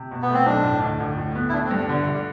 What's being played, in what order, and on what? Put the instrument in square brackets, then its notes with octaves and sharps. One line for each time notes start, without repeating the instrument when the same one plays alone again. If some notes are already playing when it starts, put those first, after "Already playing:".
Already playing: [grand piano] C3
B2
[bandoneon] B3
[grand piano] A3 [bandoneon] C4
[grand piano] B1 [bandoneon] D4
[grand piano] A2
D2
D2
A2
B3
[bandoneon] E4
[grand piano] A3 [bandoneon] D4
[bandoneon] C4
[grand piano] G2
[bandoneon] D4
[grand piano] D3 [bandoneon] B3
[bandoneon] A3
[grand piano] D3
[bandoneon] G3